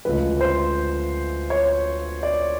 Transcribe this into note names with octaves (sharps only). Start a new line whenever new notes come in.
D2 C#3 F3 G#3 B4
C5
C#5
D5